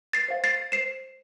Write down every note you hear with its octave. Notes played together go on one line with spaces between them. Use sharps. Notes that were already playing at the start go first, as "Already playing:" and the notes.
A6 C7
C5 F5
A6 C7
C5 C7 E7